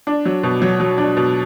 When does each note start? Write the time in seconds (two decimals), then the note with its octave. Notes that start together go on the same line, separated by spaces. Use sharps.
0.07 D4
0.26 F#3
0.43 B2
0.62 F#3
0.80 F#3
0.98 D4
1.17 B2